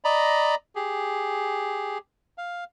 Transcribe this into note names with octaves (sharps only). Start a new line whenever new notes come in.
D5 D#5 A#5 B5
G4 G#4
F5